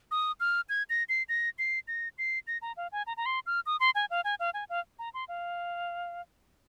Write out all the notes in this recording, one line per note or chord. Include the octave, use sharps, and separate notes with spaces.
D#6
F6
G#6
A#6
C7
A#6
C7
A#6
C7
A#6
A#5
F5
G#5
A#5
A#5
C6
F6
D#6
C6
G#5
F5
G#5
F5
G#5
F5
A#5
C6
F5